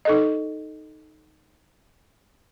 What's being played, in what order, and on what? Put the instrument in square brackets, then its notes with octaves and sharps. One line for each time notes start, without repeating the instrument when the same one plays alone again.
[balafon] D#4 A4 D#5